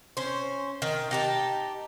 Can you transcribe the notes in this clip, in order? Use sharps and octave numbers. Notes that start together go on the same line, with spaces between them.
C#4 C5
D#3
D#4 G4 A5